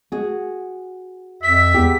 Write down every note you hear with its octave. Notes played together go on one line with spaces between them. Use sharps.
F#4 G#4
F2 E5 B6
E2 B3 G4